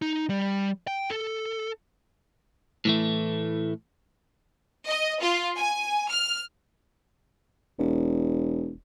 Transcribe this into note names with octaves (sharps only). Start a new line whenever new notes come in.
D#4
G3
G5
A4
A2 E3 A3
D#5
F4
G#5
F6
E1